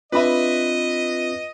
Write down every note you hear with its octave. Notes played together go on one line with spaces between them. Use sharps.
C4 D4 F4 B4 D#5 E5 B5